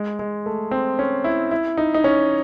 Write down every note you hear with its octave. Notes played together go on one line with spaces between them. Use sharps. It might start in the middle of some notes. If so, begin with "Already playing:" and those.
Already playing: G#3
G#3
A3
C4
C#4
E4
E4
D#4
D#4
C#4